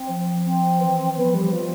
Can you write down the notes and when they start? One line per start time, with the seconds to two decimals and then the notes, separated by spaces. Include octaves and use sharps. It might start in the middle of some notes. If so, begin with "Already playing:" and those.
Already playing: C4
0.08 F3
0.45 C4
0.80 E3
1.16 F3 B3
1.34 G3
1.52 F3